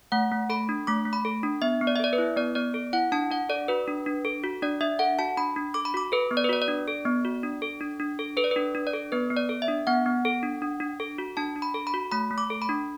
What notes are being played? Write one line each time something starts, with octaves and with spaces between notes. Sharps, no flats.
A3 F#5
A3
A4 B5
D4
A3 D6
A3
B5
A4
D4
B3 E5
B3
D5
E5
A4 D5
B4
E4
B3 D5
B3 D5
A4
E4 F#5
D4 A5
D4 F#5
A4 D5
F#4 B4
D4
D4
A4
F#4
D4 D5
D4 E5
A4 F#5
F#4 A5
D4 B5
D4
A4 D6
B5
F#4 D6
A4 B4
B3
D5
B4
F#4 D5
D5
D4
A4
B3
F#4
D4
A4
D4
D4
A4
A4 B4
D5
B4
D4
D4
D5
A4
B3 B4
B3
D5
A4
E5
D4
B3 F#5
B3
A4
D4
D4
D4
A4
F#4
D4 A5
D4
B5
A4
B5
F#4
A3 B5
A3
D6
A4
B5
D4